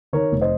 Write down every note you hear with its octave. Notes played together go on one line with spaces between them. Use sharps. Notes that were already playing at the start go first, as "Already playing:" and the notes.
D#3 A#4 C#5
F1
C5 D#5